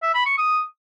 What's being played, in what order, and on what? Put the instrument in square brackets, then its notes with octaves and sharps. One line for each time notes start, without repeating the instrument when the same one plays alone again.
[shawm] E5
B5
C#6
D#6